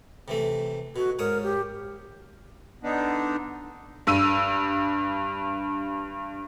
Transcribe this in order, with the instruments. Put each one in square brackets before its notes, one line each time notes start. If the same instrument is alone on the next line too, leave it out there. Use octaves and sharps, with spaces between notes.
[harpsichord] C3 E3 A3
[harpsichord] B2 [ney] F#4
[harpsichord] G#2 C#5 D#6 [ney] A#4
[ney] G4
[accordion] D3 B3 D4 D#4
[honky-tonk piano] G2 E6 D#7